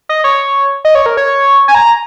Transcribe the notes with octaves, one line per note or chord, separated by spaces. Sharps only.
D#5
C#5
D#5
C#5
A#4
C#5
G#5
A#5